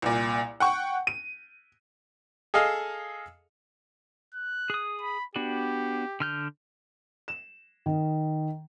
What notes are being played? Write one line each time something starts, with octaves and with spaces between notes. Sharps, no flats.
C2 A#2
F#5 G5 C#6
D#7
G#4 A4 D#5 F5
F#6
G#4 D#6
B5
B3 D4 F#4 G4
D3 F6 G6
E7
D#3